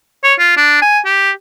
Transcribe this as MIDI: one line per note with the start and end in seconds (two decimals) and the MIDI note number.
0.24 0.34 73
0.39 0.52 65
0.57 0.79 62
0.82 0.99 80
1.05 1.31 67